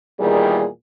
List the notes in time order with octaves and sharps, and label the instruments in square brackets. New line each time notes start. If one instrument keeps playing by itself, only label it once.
[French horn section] E2 A#2 D#3 G3 G#4